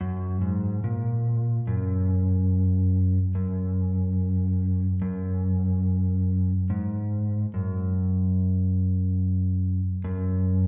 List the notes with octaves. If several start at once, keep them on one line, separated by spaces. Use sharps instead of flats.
F#2
G#2
A#2
F#2
F#2
F#2
G#2
F#2
F#2